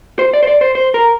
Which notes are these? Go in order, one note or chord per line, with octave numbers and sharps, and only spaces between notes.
C5
D5
C5
D5
C5
C5
A#4